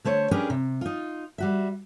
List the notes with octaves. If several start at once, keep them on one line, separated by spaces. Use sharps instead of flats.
D3 A3 C5 C#5
C#4 D4 G4 G#4 A#4 B4
C3
D#4 F4
G3 F#4 E5